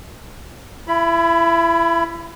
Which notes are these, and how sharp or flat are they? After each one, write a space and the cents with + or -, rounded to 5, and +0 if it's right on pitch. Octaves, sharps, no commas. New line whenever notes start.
E4 +30 B5 +0